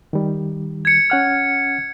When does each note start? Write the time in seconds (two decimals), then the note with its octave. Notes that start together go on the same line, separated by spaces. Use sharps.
0.13 D#3 G3
0.85 G#6 C#7
1.10 C#4 F#5 F6